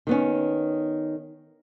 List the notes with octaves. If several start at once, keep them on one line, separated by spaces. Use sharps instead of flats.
D#3 B3 C#4